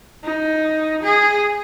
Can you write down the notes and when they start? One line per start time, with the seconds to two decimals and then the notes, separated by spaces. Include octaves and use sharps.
0.24 D#4
1.03 G#4